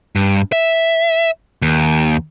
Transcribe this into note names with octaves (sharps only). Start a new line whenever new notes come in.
G2
E5
D#2